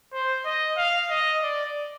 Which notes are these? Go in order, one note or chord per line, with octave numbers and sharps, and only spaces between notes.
C5
D#5
F5
D#5
D5